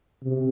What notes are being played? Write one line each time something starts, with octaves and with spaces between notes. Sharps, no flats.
C3